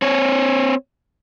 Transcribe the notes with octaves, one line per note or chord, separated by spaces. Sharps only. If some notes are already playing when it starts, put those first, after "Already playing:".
C4 C#5